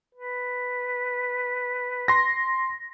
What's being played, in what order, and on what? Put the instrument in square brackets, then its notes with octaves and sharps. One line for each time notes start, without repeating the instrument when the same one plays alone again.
[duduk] B4
[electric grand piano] C6 A#6